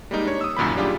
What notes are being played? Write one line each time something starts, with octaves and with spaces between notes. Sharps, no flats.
G3 G#3 A#3 D#4
D4 C#5
D#6 E6
C2 F#2 A#2 D#3 B5
G3 D4 F4 G4 G#4